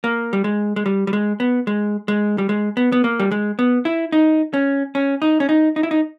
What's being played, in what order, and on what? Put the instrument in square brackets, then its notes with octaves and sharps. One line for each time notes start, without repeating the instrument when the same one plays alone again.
[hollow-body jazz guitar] A#3
G3
G#3
G#3
G3
G3
G#3
B3
G#3
G#3
G3
G#3
B3
B3
A#3
G3
G#3
B3
E4
D#4
C#4
C#4
D#4
C#4
D#4
D#4
E4
D#4